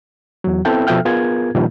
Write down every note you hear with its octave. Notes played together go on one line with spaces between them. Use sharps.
E2 F#3
B3 C4 E4 A4 E5 G5
B2 F3 A4 E5 G5 F6
B3 F4 G#4 A#4 G#6
A#2 D#3 F3 G3